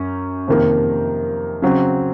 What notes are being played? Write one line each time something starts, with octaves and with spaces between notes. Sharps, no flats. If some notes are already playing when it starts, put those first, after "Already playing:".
Already playing: F#2 C#4
F2 C3 D#3 A#3
C#3 F#3 C4